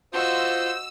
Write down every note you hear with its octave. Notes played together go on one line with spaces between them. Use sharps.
F4 F#4 C5 D#5 E6